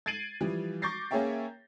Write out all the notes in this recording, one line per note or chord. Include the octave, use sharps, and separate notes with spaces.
G#6 A6 C7 D7 D#7 F#7
E3 F3 G3
C#6 D6 G6 A6 A#6 C7
A#3 C#4 G#4 C#5 E5 G5